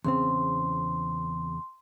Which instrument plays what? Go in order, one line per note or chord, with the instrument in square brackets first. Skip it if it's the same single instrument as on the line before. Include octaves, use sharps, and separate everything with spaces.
[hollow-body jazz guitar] E2 C#3 C4 [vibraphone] C6